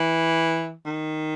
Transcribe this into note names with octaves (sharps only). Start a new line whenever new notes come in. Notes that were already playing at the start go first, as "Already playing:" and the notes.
Already playing: E3
D#3